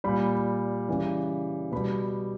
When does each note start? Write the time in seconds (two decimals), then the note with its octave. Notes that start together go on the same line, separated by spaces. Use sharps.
0.04 A#2 G3 B5
0.88 C#3 E3 G3
1.72 B2 G3 B5